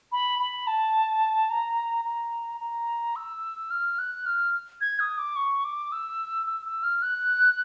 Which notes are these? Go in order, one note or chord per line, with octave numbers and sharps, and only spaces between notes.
B5
B5
A5
A#5
A#5
A#5
E6
F6
F#6
F6
G#6
D#6
D6
C#6
D6
E6
E6
E6
F6
F#6